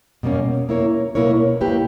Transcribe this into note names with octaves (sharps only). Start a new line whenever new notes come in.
B2 G3 A#3 C#4
A#3 E4 A#4 C#5
B2 A#3 E4 A#4 C#5
B2 A#3 E4 G4 B4